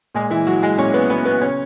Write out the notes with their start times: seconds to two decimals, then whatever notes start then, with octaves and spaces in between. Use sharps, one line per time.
0.15 A#2 G#3 G#4
0.30 E3 E4
0.47 F#3 F#4
0.62 G#3 G#4
0.78 A#2 C#4 C#5
0.94 B3 B4
1.10 F#3 B3 B4
1.25 B3 B4
1.41 C#3 C#4 C#5